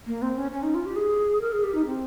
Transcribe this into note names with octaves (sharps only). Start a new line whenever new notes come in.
A#3
C4
C#4
C#4
D#4
F4
G4
G#4
A#4
G#4
G4
D#4
C4